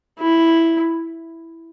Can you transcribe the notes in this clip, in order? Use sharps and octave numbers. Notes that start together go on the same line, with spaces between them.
E4